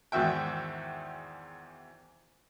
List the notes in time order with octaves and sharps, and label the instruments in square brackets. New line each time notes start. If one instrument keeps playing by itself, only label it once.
[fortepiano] E2 G#2 D#3 F#4 E5 G5